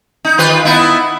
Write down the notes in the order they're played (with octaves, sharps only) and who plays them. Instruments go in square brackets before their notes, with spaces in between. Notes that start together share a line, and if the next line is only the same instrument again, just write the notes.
[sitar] D#4
D#3 F4 B4
B3 D#4 E4